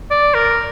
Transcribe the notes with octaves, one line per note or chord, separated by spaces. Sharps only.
D5
A#4